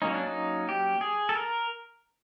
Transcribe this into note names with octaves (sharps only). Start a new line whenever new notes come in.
F#3 A#3 C#4 D#4
D4
D#4
G4
G#4
A4
A#4